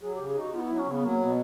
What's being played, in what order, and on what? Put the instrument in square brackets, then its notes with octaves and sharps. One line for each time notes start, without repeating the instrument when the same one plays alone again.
[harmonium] F#3 [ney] G#4
[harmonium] C#3 [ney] G4
[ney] G#4
[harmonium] D#4 [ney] F#4
[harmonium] B3 [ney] F4
[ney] D#4
[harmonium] F#3 [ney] E4
[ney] C#4
[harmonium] C#3
[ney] B3
[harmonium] F#3 [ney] A#3
[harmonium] B2 [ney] B3